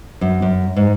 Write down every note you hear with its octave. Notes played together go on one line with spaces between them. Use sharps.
F#2
F#2
G#2